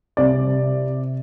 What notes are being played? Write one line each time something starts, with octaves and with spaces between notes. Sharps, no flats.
C2 D5
C3